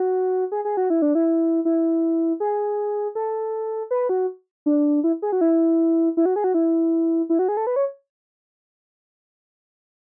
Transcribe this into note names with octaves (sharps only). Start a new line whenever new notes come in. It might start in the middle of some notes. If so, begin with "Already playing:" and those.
Already playing: F#4
G#4
G#4
F#4
E4
D4
E4
E4
G#4
A4
B4
F#4
D4
E4
G#4
F#4
E4
E4
F#4
G#4
F#4
E4
E4
F#4
G#4
A4
B4
C#5